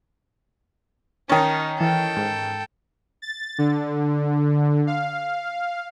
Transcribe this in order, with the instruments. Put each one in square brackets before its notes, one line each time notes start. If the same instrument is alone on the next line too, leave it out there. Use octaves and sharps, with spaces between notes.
[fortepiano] D#3 C#4 [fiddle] D#4 [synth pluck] A5
[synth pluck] E3 [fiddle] A4 G5
[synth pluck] G#2
[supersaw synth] A6
D3
F5